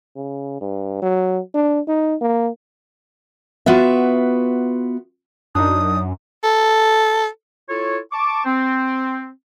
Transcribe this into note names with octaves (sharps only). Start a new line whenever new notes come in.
C#3
G2
F#3
D4
D#4
A#3
B3 F4 F#4 B4 E5
F#2 D4 D#4 D#6
A4
E4 F4 A4 C#5
A5 C#6 D6
C4